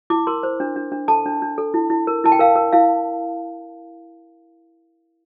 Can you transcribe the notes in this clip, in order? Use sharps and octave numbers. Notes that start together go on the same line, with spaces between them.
E4 D6
A#4 C6
C5
D4
D4
D4
A4 A5
D4
D4
A4
E4
E4
A#4
E4 A5
G5
A#4 F5
A#4
E4 F5